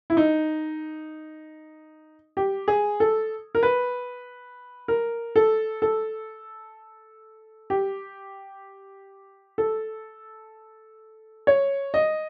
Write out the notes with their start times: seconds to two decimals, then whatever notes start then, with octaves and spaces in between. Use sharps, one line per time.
0.10 E4
0.17 D#4
2.37 G4
2.68 G#4
3.00 A4
3.55 A#4
3.63 B4
4.88 A#4
5.36 A4
5.82 A4
7.70 G4
9.58 A4
11.47 C#5
11.94 D#5